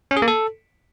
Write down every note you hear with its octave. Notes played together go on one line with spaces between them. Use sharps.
C#4
G#4
A#3
A4